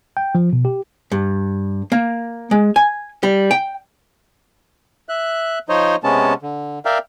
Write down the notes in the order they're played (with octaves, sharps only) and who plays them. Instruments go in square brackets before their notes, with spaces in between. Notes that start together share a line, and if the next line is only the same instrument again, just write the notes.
[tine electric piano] G5
F3
B2
G4
[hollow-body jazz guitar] G2
A#3
G#3
G#5
G3
G5
[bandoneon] E5 F#6
F3 D#4 C5 C#5 D#5
C3 G#3 B3 C#4 A5
D3
A#4 D5 E5 F5 G5